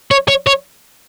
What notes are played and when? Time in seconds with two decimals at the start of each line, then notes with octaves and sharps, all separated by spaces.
0.11 C#5
0.28 C#5
0.47 C#5